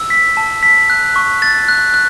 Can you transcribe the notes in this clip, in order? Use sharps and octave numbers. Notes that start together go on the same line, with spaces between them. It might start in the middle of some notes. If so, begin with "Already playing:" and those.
Already playing: E6
B6
A5
B6
F#6
C#6
A6
F#6
F#6